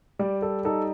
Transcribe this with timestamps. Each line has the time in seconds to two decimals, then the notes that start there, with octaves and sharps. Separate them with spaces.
0.19 G3 D5
0.42 A4
0.65 D#4 A4